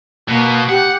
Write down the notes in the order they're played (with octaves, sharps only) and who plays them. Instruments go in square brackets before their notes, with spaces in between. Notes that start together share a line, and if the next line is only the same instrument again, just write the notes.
[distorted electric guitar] B2 [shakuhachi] A#3
[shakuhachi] G4 [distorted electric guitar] F#5